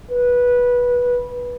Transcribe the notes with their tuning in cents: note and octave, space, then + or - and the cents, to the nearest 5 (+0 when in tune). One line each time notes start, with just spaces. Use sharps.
B4 -15